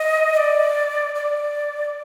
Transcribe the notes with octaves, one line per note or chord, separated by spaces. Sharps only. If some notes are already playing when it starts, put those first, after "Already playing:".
Already playing: D#5
D#5
D5
D5